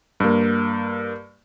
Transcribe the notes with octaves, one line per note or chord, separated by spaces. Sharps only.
G2 A#3